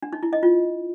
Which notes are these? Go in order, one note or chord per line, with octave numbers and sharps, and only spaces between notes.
D4
D#4
E4
D#5
F4